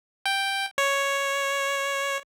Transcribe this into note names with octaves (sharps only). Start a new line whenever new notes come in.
G5
C#5